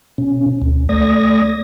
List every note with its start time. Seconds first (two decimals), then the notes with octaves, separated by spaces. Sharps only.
0.18 B2 C#4
0.62 D2
0.89 A3 D5 D#6 G#6 A#6